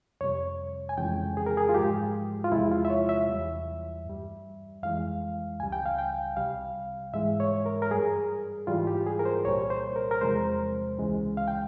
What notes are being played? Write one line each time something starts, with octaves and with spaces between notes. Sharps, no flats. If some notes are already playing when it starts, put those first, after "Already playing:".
F2 C3 G3 C#5
G#5
F2 C#3 E3 G#3 G5
G#4
A#4
G#4
F4
G#2 F3 G#3 G4
F4
E2 C3 F3 G#3 E4
F4
E5
C#5
E5
E2 E3 G3
G2 G3
F2 E3 G#3 F5
C#2 C#3 G3 G#5
G5
F5
G5
C2 C3 G3 F5
G#2 E3 G#3 E5
C#5
A#4
A#4
G2 G3 G#4
G#2 E3 G3 F4
G4
G#4
A#4
C5
C2 A#2 G3 C#5
C5
A#4
A#4
E2 C3 F3 G#3 C5
C#2 C#3 E3 G#3
F5
G5